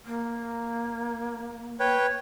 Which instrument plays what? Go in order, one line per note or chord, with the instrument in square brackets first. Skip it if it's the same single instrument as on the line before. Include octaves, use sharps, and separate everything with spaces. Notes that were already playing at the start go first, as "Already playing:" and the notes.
[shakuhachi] A#3
[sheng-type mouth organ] B4 C#5 G5